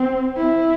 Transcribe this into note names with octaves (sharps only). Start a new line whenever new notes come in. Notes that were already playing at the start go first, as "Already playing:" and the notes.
Already playing: C4
E4